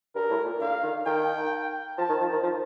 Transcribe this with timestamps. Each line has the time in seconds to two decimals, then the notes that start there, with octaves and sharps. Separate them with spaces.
0.15 G2 A#4
0.30 A2
0.45 A#2
0.61 D3 F5
0.83 D#3
1.06 D#3 G5
1.98 F3 A5
2.09 D#3
2.20 F3
2.32 D#3
2.43 F3